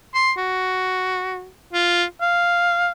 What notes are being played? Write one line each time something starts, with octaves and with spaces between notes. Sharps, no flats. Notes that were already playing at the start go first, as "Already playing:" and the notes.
C6
F#4
F4
F5